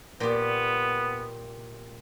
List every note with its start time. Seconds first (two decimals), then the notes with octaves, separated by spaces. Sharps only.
0.20 A#2 B3 G4